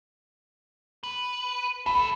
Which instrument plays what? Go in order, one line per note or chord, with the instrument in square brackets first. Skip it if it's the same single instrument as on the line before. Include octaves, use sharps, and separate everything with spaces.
[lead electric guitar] B4
[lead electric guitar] C#2 A4 [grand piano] B5